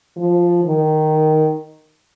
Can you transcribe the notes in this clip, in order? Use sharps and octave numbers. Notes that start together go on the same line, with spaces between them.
F3
D#3